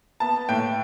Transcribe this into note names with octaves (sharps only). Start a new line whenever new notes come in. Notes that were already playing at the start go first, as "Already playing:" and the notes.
B3 A5
A2 G5